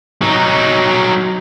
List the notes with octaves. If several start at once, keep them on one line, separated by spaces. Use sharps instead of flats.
F#3 D#4